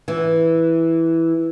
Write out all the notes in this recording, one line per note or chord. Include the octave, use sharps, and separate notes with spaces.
E3